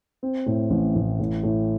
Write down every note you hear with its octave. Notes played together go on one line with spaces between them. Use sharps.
C4
A2
A1
A1
A2
A2